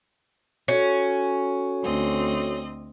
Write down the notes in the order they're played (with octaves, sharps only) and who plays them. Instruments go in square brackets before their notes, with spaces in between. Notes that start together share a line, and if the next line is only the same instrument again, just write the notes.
[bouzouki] C#4 [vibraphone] F#4 A4 F#5
[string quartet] D2 C4 D#5